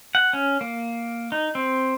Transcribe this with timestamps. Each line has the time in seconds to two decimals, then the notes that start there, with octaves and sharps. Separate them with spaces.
0.15 F#5
0.33 C#4
0.61 A#3
1.32 D#4
1.55 C4